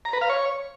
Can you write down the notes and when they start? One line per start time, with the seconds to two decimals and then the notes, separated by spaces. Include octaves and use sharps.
0.05 A#5
0.13 B4
0.21 F5
0.30 C#5